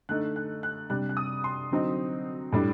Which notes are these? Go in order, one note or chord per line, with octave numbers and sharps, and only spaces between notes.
D3 A3 D#4 F#6
F#6
F#6
C3 G3 D4 F#6
F#6
D#6
C6
D3 F#3 C4 D#4
A2 G3 D4